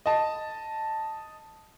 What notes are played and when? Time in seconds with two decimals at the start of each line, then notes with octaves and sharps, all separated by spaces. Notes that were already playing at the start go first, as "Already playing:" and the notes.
0.06 D#5 A5